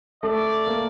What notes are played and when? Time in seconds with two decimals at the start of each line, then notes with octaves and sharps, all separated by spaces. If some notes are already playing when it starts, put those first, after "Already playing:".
0.23 A3 D5
0.67 A#3